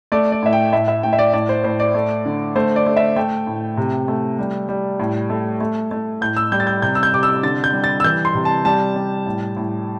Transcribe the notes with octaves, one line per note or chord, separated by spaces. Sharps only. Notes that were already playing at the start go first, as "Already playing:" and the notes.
A3 D5
D5
A2 E5
G5
A2 E5
E5
A2 G5
E5
D5
A2 D5
C5
A2 C5
D5
A3
D3
A3 C5
D5
A3
E5
A3 G5
A2
C3
A3
G3
G3
A2
A3
A3
A3
A2 G6
E6
G3 G6
A6
G6
C3 G6
E6
G6
C3 D6
E6
D3 A6
G6
G3
A6
E6
E3 G6
C6
C3
A5
G3 A5
G3
A2
A2